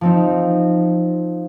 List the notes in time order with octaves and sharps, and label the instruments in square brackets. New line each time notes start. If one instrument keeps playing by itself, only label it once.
[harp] F3 C4 D#4